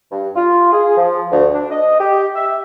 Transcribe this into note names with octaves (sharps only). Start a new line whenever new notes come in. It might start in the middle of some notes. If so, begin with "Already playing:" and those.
G2
F4
G#4
F3
D2
D4
D#5
G4
E5